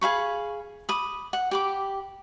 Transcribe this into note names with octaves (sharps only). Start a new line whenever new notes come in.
G#4 F5 B5 C#6
B5 D6 D#6
F#5
G4 B5 D6